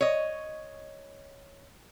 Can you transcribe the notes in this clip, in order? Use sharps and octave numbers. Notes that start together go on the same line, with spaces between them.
C#5 D#5